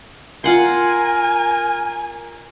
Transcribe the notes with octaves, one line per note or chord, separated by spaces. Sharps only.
F4 A#4 F#5 G#5 C6